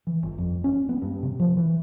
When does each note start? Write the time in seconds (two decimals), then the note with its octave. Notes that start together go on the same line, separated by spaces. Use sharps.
0.07 E3
0.23 G1
0.38 F2
0.64 C#4
0.89 B3
1.02 G2
1.23 C3
1.40 F3
1.57 E3